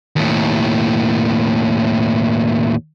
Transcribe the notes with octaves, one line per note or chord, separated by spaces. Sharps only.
D#2 A2